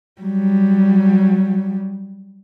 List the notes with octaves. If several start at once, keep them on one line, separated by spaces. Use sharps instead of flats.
F#3 G3